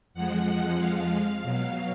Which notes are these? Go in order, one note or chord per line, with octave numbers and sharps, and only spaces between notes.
F2 F3 G#3 F#5
F#5
F5
B2 F#3